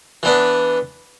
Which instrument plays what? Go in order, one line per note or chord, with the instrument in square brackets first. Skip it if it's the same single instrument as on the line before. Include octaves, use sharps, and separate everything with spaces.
[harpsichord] E3 B3 D4